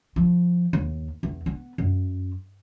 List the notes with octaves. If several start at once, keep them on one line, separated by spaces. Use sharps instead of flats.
F3
D#2
E2
B3
F#2